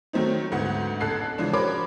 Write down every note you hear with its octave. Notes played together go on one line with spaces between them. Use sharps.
D#3 F#3 A3 C4 D#4
D2 G#2 B3 F#5
A1 A4 F#6 C7
C#3 E3 F3 G#3 D4
F#4 A#4 C5 C#5 B5 D6